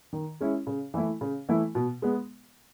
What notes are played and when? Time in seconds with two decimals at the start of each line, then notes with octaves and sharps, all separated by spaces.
0.13 D#3
0.40 G#3 C#4 E4
0.67 C#3
0.94 E3 A3 E4
1.21 C#3
1.49 E3 A3 E4
1.75 B2
2.02 G#3 B3